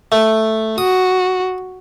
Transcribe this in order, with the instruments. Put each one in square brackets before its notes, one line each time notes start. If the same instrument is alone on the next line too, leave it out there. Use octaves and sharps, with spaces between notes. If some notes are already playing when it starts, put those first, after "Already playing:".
[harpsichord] A3
[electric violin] F#4 [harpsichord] D#6